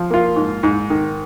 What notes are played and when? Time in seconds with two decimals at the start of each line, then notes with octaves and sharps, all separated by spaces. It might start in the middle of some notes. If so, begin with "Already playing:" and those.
Already playing: F3
0.10 A#3 F4
0.36 G#2
0.63 G#2
0.90 D#3